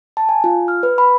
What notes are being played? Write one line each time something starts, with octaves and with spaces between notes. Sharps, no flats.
A5
G#5
F4
F6
B4
B5